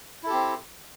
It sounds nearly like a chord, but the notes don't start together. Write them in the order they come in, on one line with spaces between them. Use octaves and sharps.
E4 A4 G4 C4